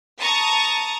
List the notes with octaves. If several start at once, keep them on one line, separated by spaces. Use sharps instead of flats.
A5 A#5 C#6 D#6